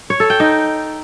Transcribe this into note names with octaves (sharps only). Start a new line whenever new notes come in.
C#5
A4
G5
D#4